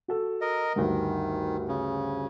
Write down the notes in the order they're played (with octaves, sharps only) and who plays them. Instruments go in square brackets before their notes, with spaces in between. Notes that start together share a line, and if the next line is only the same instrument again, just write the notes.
[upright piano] F#4 A4
[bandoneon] A#4 D#5
[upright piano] D2 G2 [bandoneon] D#3
[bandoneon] C#3